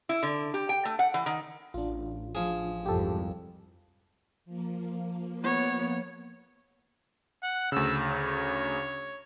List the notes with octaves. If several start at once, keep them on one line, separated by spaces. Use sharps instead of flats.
E4
D3
G4
G5
A3
F#5
E3
D#3
A1 D4 F4
F3 G#4
C2 F2 G#2 G4 A4
F3 A#3
B3 C#5
F#5
D2 C#3 E6
C#5